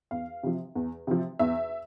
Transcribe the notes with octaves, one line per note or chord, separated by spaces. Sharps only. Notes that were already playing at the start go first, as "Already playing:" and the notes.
E2 F5
C3 F3
E2
C3 F3
E2 E5